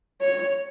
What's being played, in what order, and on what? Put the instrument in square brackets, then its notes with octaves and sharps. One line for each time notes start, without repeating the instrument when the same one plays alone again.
[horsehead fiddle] C#5